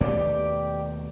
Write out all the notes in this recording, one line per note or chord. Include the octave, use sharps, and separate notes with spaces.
D#2 B2 A3 G4 D5